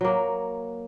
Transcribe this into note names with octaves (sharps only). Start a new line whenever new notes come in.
F#3 A#3